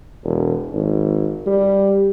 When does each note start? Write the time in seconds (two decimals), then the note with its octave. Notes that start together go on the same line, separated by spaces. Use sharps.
0.24 E1
0.72 G#1
1.46 G3